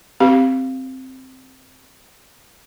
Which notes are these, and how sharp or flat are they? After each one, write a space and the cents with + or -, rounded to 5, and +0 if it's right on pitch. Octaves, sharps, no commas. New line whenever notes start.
C4 +0 G4 +0 F5 +0